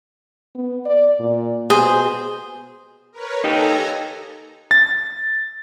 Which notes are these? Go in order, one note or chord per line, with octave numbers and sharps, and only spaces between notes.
B3
D5
A#2
B2 G#4 C5
A#4 B4 C#5
D#4 G4 A4 G#5 A#5
A6